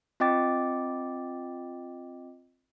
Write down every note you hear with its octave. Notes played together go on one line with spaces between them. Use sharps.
C4 F4 D#5 G5 D6 A6